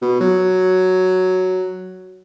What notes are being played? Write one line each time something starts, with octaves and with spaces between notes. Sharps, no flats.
B2
F#3